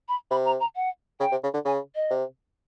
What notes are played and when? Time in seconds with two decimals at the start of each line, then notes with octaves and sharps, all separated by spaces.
0.08 B5
0.31 C3 B5
0.45 A#5
0.60 A#5
0.76 F#5
1.20 C#3 G5
1.32 C3
1.43 C#3
1.54 D3
1.65 C#3 G#5
1.95 D#5
2.10 C3